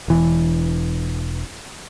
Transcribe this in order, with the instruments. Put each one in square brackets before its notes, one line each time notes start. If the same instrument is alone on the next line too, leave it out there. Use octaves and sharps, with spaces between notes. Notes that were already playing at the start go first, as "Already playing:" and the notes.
[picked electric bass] E1 E3